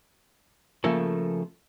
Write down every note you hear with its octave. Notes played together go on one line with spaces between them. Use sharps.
C#3 F3 A3 A#3 A4